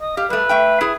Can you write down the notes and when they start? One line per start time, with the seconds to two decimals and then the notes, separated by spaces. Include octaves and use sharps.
0.01 D#5
0.17 G4 F5
0.30 G3 A3 B4
0.49 A3 E5 G5
0.81 E4 G#4